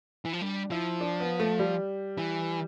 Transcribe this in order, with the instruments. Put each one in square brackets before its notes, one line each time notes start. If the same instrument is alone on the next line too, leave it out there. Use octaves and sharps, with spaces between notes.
[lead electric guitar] E3
F3
[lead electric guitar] G3 [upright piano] D4
[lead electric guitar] F3 [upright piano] E4
[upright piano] D4
B3
A3
G3
[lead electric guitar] E3